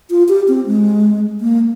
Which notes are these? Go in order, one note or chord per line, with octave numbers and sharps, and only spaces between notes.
F4
G4
C4
G#3
A#3